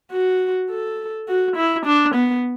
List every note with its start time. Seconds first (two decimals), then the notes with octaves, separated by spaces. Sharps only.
0.12 F#4
0.70 A4
1.28 F#4
1.57 E4
1.86 D4
2.15 B3